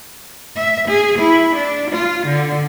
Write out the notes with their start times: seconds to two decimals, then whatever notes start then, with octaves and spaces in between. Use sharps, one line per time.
0.56 E5
0.88 G#4
1.19 E4
1.55 D4
1.90 F4
2.27 D3